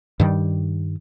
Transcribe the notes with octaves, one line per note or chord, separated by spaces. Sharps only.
G2 D#3 G3